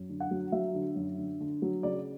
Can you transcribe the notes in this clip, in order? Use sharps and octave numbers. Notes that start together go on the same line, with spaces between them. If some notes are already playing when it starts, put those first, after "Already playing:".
Already playing: F#2
D3
F#5
F#3
F#3 E5
D3
F#2
D3
D3
F#3
C#3 D5